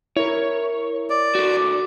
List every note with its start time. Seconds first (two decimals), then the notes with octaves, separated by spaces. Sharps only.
0.17 E4 A#4 C#5
1.10 D5
1.35 F#4 A4